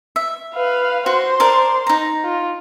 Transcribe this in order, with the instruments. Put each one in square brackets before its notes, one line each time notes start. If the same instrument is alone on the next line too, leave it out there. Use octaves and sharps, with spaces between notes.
[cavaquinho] E5
[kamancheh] B4 F5
[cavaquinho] F#4 [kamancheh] C5 C6
[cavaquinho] A#4 D5 A5
D#4 A#5
[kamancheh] F4